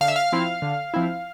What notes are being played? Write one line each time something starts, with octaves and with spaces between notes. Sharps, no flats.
D3 F5
E5
F5
F3 C4 E4
D3
F3 C4 E4